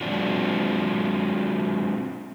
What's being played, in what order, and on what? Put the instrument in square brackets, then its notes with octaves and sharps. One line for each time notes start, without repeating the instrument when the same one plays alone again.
[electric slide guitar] F#3 G#3 C4 D4 F4 F#4